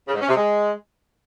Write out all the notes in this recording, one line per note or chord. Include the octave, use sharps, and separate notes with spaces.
C#3
G#2
C#4
C3
G#3